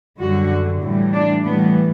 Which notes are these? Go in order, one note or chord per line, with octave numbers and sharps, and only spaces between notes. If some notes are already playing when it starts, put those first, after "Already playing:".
F#2 D3 G3 F#4
A2 E3 G3
D4
A2 E3 G3 B3